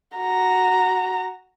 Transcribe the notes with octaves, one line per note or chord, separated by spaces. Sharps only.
F#4 A#5